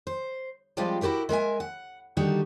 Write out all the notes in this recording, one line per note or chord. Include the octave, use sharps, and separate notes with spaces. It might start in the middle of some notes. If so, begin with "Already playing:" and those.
C5
F3 G3 G#3 C4 F4 G4
E4 F#4 G4 A#4 E5
G#3 A#4 E5 G#5
F#5
D3 D#3 G3 D#4 F#4 G4